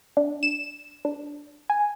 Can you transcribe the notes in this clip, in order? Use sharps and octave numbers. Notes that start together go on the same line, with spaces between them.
D4
E7
D4
G#5